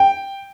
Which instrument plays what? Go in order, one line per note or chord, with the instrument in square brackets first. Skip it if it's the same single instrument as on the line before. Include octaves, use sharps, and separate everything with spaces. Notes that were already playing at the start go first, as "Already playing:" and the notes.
Already playing: [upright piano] G5